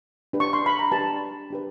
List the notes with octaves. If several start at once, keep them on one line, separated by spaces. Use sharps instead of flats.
D4 G4 B4
C#6
C6
B5
A#5
D4 G4 B4 A5
D4 G4 B4